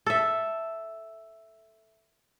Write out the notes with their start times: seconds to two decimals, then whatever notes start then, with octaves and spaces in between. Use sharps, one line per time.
0.06 A4 E5